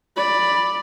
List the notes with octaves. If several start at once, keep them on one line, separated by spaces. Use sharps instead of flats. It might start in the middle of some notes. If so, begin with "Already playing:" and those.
D5 B5